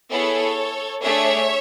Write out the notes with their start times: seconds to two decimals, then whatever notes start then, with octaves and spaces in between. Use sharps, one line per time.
0.11 B3 E4 G#4 A4 C#5
1.03 A3 D4 G#4 C#5 E5